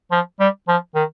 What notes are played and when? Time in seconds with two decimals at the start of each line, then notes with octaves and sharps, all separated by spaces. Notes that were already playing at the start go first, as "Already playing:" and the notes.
0.12 F3
0.40 G3
0.68 F3
0.95 D#3